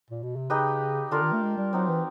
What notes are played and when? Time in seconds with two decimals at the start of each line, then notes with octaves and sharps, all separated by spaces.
0.10 A#2
0.23 B2
0.36 C3
0.50 C#3 D#4 G4 B4 D#5
1.11 D3 D4 F4 A#4
1.22 D#3
1.32 A3
1.42 G#3
1.57 G3
1.73 F#3 C4 D#4 F#4
1.88 E3